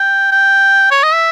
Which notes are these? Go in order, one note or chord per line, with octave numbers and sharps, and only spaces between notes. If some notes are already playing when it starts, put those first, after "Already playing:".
Already playing: G5
G5
C#5
D#5
E5